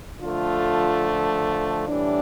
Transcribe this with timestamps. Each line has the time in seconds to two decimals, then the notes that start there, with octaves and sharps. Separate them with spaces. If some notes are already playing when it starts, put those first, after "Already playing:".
0.21 D3 F3 A3 F4
1.87 A2 E3 G3 D4